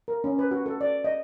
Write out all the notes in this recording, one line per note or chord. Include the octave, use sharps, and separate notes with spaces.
A#4
C#4
B4
F#4
A4
D5
D#5